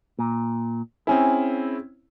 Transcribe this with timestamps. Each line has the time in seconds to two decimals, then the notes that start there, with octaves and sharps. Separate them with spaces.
0.19 A#2
1.07 C4 C#4 E4 G#4